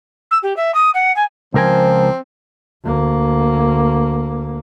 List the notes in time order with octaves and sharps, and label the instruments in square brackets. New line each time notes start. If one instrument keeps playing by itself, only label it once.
[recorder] E6
G4
E5
D#6
F#5
G#5
[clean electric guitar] C#2 A#4 G#5 [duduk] F3 [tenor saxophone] C4 [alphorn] C5
[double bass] D2 A#3